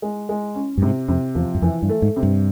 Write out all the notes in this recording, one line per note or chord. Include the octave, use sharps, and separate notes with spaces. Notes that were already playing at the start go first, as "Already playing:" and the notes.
G#3
G#3
C#4
G2
G#2 C3
F2 C3
E2 F3
F#2
F2 E3
G2
A3
G#2
C3
G2